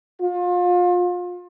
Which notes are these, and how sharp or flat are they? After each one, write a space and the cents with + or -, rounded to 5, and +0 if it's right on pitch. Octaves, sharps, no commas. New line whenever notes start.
F4 +30